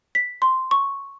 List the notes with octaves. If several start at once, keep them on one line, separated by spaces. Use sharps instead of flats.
B6
C6
C#6